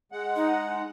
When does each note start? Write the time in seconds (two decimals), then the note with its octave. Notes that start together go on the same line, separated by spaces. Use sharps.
0.12 G#3 F#5
0.36 D#4